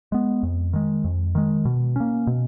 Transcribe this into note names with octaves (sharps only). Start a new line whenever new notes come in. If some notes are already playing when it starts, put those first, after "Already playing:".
G#3 B3
F2
D#3 G#3
F2
D#3 G#3
B2
A#3 C#4
B2